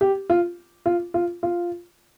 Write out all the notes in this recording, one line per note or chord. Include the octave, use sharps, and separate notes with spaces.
G4
F4
F4
F4
F4